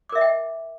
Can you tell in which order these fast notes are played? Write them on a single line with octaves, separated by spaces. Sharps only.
D6 A#4 E5 D#5 G5